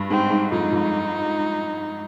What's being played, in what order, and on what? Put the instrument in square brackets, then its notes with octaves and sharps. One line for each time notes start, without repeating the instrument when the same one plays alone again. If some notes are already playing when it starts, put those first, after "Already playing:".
Already playing: [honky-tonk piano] G2
[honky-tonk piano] G#2 [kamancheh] C4
[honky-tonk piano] G#2
[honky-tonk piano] F2 [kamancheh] D#4
[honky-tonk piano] F2